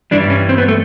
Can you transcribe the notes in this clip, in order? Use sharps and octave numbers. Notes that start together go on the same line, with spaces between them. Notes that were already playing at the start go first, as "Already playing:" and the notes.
G2 E3 G3 D4
C#4
C4
B3
A3